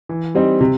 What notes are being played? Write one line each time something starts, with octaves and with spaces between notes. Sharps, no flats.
E3
G3 C4 D#4
C3